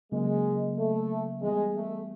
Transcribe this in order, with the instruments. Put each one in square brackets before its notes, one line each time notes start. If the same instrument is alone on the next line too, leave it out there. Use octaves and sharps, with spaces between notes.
[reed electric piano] C#3 F#3 A#3 [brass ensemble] G#3
[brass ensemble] A3
[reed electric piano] E3 G3 B3 [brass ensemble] G#3
[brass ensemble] A3